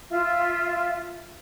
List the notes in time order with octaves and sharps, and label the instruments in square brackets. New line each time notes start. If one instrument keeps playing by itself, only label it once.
[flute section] F4 E5